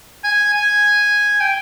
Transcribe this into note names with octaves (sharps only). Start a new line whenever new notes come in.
G#5
G#5
G5